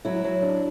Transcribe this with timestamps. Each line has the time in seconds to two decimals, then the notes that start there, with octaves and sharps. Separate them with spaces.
0.05 F#3 E4
0.24 F#3
0.42 D4